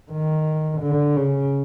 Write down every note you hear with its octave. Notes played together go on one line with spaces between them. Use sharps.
D#3
D3
C#3